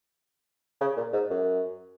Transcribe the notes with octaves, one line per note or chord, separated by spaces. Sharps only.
C#3
A#2
G#2
F#2